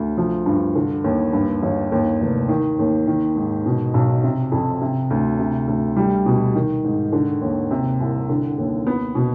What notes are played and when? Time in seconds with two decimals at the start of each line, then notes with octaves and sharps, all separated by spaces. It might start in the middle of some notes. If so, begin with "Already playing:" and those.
Already playing: D2
0.17 F3
0.46 G2
0.75 D3
1.04 D#2
1.33 G2
1.62 G1
1.92 D#2
2.20 F1
2.49 D#3
2.79 D#2
3.07 D#3
3.36 G#2
3.66 B2
3.94 B1
4.23 C3
4.52 F2
4.81 C3
5.10 D2
5.39 C3
5.67 D2
5.97 G3
6.26 B2
6.55 D#3
6.84 G#2
7.13 D3
7.41 D#2
7.71 C3
8.00 C2
8.29 D3
8.58 D#2
8.87 B3
9.15 B2